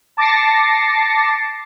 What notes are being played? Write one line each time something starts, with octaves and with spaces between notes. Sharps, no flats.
A5 D6 A6 A#6 C7 C#7